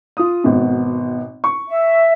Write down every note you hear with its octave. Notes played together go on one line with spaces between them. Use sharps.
F4 D#6
G#1 B2
C#6
E5